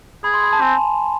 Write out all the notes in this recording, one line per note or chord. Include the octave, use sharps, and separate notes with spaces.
G#4 B5
C6
B5
A5
C4 G#5